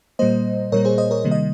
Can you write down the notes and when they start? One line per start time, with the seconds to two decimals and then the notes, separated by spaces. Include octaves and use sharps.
0.19 A#2 G3 A#3 C5 D#5
0.72 A#2 G3 A#3 A#4 C#5
0.85 G#4 C5
0.98 C5 D#5
1.11 A#4 C#5
1.24 C3 D#3 G3 A#3
1.31 D#5